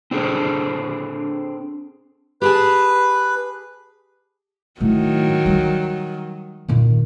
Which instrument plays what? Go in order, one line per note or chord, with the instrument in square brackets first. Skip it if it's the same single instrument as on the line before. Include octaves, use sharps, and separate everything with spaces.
[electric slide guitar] C4 D4 G#4 A4 C5
[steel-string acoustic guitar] G4 G#4 A5 [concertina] B4
[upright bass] A2 [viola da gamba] D#3 F#3
[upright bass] G3
A#2 D#3